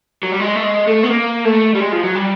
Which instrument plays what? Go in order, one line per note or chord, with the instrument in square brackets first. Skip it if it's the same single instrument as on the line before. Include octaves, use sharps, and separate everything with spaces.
[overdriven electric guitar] F#3
G3
G#3
A3
G#3
A3
B3
A#3
A3
G3
G#3
F3
F#3
G3